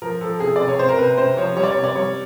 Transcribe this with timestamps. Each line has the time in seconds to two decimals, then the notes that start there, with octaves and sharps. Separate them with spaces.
0.02 F3 A#4
0.21 F3 A4
0.40 C3 G#4
0.56 C3 D5
0.68 C#5
0.79 C3 C5
0.89 A#4
0.98 C3 B4
1.17 C3 C5
1.37 F3 C#5
1.56 G3 C#5
1.64 D5
1.71 C3 C#5
1.84 D5
1.95 G3 C#5